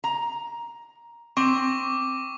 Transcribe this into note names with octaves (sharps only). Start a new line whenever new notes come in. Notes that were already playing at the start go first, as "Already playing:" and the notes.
A#5
C4 C#6 D6